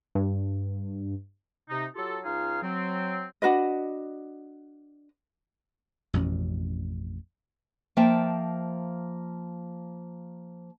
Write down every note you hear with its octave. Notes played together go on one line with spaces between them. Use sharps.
G2
C3 D#4
F#3 F4 G4 A4
C#2 D#4 F4 G#4 F5 F6
F#3 C4
D4 F#4 B4 D#5
A1 F2 B2 C#4
F3 A#3 E5 G5 A5